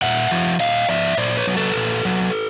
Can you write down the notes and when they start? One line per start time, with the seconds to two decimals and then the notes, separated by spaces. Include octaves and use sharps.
0.02 A#2 E5 F#5
0.31 F3
0.60 A#2 D#5 F5
0.89 F3 D5 E5
1.17 A#2 C5 D5
1.37 B4 C#5
1.47 F#3
1.57 A4 B4
1.77 A#2
2.05 F#3